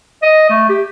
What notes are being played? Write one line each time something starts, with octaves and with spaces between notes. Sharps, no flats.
D#5
A3
G4